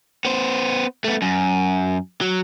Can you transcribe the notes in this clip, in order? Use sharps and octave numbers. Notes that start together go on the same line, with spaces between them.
B3 C5
A3 B3
F#2
F#3